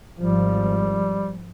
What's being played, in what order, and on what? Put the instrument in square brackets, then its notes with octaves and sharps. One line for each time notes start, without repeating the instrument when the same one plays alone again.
[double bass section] G#1 F3 [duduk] G3